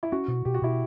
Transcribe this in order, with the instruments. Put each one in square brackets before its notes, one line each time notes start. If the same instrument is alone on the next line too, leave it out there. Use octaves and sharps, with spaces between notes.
[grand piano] E4
[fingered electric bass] C#4 [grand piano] F#4
[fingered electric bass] B2
[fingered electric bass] B2 [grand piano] G4
[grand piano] F#4
[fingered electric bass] B2 [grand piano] E4 G4